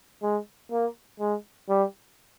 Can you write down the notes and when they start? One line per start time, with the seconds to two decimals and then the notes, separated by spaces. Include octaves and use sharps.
0.22 G#3
0.71 A#3
1.20 G#3
1.69 G3